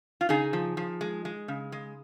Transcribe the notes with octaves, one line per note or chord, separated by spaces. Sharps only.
F4
C#3 D#4 G#4
F3
F3
G#3
G#3
C#3
G#3